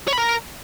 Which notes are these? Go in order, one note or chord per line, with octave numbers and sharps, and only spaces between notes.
C#5
B5
A#4